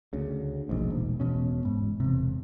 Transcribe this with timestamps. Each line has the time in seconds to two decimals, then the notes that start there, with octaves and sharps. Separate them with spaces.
0.13 D2 C#3
0.69 E1 A#1 G#2
0.90 E1
1.20 E1 B2 C#4
1.65 G#2
2.00 E1 C3